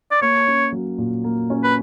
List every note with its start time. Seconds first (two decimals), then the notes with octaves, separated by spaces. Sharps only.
0.11 D5
0.21 A#3 C#5
0.47 C#4
0.72 F#3
0.98 A#2
1.24 A#3
1.50 C#4
1.64 B4